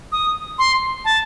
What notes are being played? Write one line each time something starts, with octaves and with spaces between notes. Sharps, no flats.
D#6
C6
A5